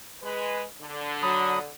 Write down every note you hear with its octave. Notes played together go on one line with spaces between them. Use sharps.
G#3 B4
D3
F#3 B5 D#6